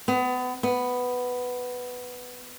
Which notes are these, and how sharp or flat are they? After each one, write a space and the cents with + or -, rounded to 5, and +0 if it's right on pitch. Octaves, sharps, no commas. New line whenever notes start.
B3 +30
B3 +5